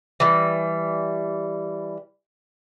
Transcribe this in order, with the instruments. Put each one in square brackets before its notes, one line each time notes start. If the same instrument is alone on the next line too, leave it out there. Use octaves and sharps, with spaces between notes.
[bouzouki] E3 G3